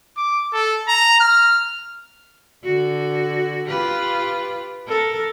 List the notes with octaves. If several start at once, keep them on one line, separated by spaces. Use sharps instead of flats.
D6
A4
A#5
F6
D3 F#4
F4 G4 B4
A4 A#4